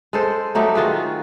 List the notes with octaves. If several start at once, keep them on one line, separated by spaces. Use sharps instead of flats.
G#3 A4 C5
F#3 A3 D#4 G4
D#3 F4 F#4 G#4